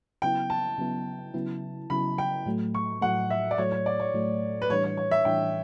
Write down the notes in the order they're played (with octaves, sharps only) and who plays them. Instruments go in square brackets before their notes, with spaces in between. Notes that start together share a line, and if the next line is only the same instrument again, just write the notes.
[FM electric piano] C#3 F#3 B3 E4 [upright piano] G5
[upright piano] A5
[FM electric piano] C#3 F#3 B3 E4
C#3 F#3 B3 E4
[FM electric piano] C#3 F#3 B3 E4 [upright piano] B5
[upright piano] G5
[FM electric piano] A2 F#3 A3
[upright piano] C#6
[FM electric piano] A2 F#3 A3 [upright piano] F#5
[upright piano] E5
D5
[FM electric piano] A2 F#3 A3 [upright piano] C#5
[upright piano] C#5
D5
C#5
[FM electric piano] A2 F#3 A3
[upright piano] B4
[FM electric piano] A2 E3 G3 D4 [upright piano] C#5
[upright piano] C#5
C#5
E5
[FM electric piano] A2 E3 G3 D4 [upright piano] G5